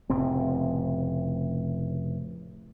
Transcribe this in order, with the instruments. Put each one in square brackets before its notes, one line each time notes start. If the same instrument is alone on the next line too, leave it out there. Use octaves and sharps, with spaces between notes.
[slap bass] F1 A2 C#3 C4